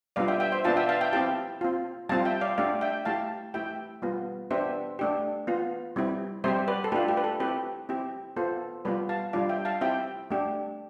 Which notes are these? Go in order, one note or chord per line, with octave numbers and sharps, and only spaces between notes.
G3 B3 D4 F4 D5 F5
E5 G5
E5 G5
C5 E5
B3 D4 F4 F5 A5
E5 G5
F5 A5
E5 G5
C4 E4 G4 F5 A5
C4 F4
G3 C4 F4 F5 A5
E5 G5
D5 F5
A3 D4 G4 D5 F5
E5 G5
A3 E4 G4 F5 A5
A3 E4 G4 E5 G5
G3 B3 F4
B3 D4 G4 C5 E5
A3 D4 G4
B3 F4
G3 C4 E4
G3 C4 G4 C5 E5
B4 D5
A4
A3 D4 F4 G4 B4
G4
B4
A4
C4 E4 G4 B4
C4 E4 G4
B3 F4 A4 C5
G3 B3 F4 B4 D5
F5 A5
G3 D4 F4 D5 F5
E5 G5
F5 A5
C4 E4 G4 E5 G5
A3 D4 G4